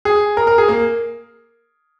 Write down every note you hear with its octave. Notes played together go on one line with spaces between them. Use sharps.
G#4
A#4
A#4
G#4
A#3